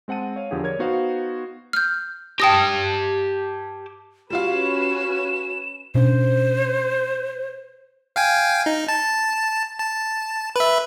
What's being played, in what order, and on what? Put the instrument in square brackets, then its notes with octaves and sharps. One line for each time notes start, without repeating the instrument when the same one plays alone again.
[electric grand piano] G#3 C4 F#5 A5 D#7
C#5 F5
E2 D3 F3 G4 G#4 F#5
A#4 C#5 D5 G#6
B3 D#4 F#4 C5 F5
[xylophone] F6 G6
[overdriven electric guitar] G4 A5 [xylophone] G5 D#6 A#6
[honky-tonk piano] G3 F4 F5 [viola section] C#4 B4 [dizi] F#4 [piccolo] E7
[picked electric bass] B2 C#4 D4 [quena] C5
[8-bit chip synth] F5 G5 G#5
D#4
A5
A5
B4 E5